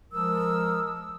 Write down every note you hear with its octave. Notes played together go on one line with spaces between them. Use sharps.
F3 G#3 A#4 D#6 E6